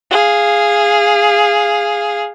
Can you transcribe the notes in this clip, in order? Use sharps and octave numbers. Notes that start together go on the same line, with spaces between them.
G#4 F5